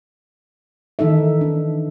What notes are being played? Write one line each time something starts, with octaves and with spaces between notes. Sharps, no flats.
D#3 E3 D#4 A4 E5
D4